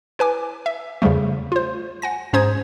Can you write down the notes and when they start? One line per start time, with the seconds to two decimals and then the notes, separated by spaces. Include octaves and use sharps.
0.19 E4 B4 G#5 D6
0.66 E5
1.02 E2 C#3 F3 G3 A3
1.52 F4 C5
2.02 F#5 G#5 A#6
2.33 G#2 C#4 C5 A#5 D#6 G#6